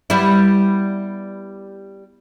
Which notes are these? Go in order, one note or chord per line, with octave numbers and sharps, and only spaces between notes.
G3 B3 E4